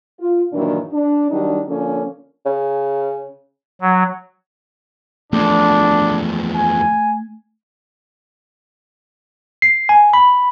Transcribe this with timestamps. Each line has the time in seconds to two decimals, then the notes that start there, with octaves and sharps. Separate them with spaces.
0.20 F4
0.53 G2 A#2 D#3 E3 F#3 D4
0.92 D4
1.31 D#3 F#3 G3 D4 D#4
1.67 D3 F3 A#3 C#4
2.46 C#3
3.82 F#3
5.33 E2 F3 A3 D4
6.55 G#5
9.62 C7
9.89 G#5
10.13 B5